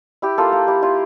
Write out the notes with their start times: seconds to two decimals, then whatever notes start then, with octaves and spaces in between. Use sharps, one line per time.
0.22 E4 G4
0.38 A#3 F4 A4
0.52 A#3 F4
0.68 E4 G4
0.82 E4 F4